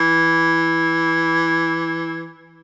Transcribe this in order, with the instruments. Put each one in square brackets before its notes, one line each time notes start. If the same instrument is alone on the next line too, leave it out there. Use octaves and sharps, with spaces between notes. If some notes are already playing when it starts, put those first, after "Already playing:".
Already playing: [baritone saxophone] E3